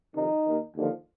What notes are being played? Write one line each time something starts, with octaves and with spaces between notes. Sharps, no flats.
F2 C3 D#3 D#4
D#2 D#3
D#2 D3 F3